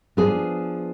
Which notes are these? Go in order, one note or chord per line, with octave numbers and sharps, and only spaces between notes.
F3 B3 D4 G#4